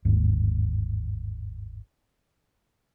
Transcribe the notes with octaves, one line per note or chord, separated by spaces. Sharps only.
G1 D#2 G#2